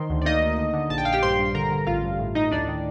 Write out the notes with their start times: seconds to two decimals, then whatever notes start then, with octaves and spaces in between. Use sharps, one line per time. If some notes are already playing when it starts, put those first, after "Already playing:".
Already playing: D#3 C5 C6
0.10 D2
0.22 D5
0.26 A#3 D#4 D#5
0.41 D#3
0.59 D3
0.74 D3
0.90 A#1 A5
0.98 G5
1.05 A#1 F5
1.13 G4 G5
1.23 G2 C5 C6
1.39 G2
1.55 D3 A#4 A#5
1.72 D3
1.87 A1 F4 F5
2.04 G2
2.19 A2
2.35 A2 D#4 D#5
2.51 D2 D4 D5
2.68 D#3